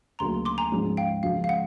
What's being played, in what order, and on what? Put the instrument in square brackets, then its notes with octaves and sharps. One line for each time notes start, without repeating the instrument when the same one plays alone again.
[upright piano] D2 C#3 F#3 A#3 [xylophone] A#5 C6
[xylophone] C6 D6
G#5 A#5
[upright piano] G#2 F3 G#3 C#4 F#4
[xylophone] F5 G5
[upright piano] C#2 C#3 F3 [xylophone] F5
[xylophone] F5
F#5